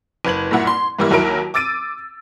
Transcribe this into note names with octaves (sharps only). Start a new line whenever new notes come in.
F#1 B4 G#6 F#7
G2 A#2 E4 F#5
C6
G#2 E3 G3 A#3 E4
D#2 F#3 E4 A#4 D7
D6 E6 A6 D7 D#7